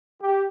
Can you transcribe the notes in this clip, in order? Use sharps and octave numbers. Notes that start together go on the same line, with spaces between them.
G4